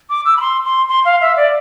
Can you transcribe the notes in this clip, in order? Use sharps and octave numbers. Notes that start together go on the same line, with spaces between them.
D6
E6
B5
C6
C6
C6
F5
E5
D5